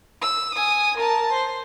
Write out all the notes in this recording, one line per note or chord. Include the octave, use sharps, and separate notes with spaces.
E6
G#5 D#6
A#4 A5
C5